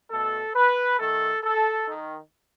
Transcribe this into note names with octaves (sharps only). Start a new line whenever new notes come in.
B2 A3 A4
B4
D#3 A3 A4
A4
D#3